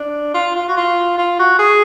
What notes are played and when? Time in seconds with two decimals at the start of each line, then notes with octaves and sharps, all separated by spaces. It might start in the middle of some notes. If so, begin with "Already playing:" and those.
Already playing: D4
0.34 F4
0.56 F4
0.68 F#4
0.77 F4
1.18 F4
1.39 F#4
1.59 G#4